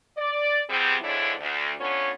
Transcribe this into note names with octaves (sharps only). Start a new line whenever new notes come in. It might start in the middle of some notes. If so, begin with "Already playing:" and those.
D5
C3 F3 G3 B3 C4 G#4
F2 D3 G#3 D4 E4 C#5
D2
D3 B3 C#4 F4 C#5